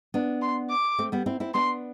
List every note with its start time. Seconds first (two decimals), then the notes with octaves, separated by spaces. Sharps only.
0.14 B3 D4
0.42 C6
0.70 D6
0.98 A3 C4
1.12 G3 B3
1.26 C4 E4
1.40 C4 E4
1.54 B3 D4 C6